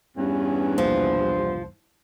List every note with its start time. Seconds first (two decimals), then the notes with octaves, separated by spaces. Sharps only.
0.17 E2 G2 C#4
0.78 E1 C2 F3 A#3 C5